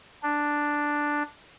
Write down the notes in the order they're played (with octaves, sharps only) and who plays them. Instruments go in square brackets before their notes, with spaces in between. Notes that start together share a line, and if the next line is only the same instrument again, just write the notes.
[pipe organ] D4